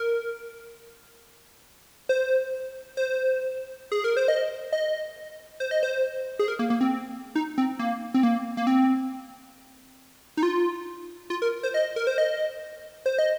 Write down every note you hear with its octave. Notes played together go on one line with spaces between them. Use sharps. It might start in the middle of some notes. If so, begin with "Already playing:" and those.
Already playing: A#4
C5
C5
G#4
A#4
C5
D#5
D#5
C5
D#5
C5
G#4
A#4
A#3
A#3
C4
D#4
C4
A#3
C4
A#3
A#3
C4
D#4
F4
F4
A#4
C5
D#5
A#4
C5
D#5
C5
D#5